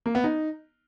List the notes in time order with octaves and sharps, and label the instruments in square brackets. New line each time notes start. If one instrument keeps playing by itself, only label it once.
[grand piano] A#3
B3
D#4